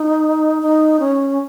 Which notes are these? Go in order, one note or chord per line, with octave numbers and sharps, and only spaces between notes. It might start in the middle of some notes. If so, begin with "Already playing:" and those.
Already playing: D#4
D#4
C#4